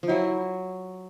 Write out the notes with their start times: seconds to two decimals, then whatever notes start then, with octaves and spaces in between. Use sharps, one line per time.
0.03 F3
0.08 F#3 E4